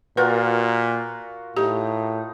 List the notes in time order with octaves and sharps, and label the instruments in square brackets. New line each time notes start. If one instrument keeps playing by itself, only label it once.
[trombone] A#2 [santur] F4 F#4 A#4 [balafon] B4
[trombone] A2 [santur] D#4 [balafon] G4